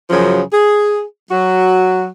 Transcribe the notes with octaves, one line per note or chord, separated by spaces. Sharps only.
F#2 C#3 F3 F#3
G#4
F#3 F#4